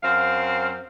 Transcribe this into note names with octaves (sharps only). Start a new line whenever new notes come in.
F#2 C4 F5